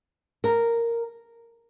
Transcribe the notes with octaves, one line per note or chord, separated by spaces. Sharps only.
A#4